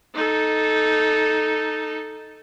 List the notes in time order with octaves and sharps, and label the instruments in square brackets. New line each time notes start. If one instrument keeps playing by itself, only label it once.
[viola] D#4 A4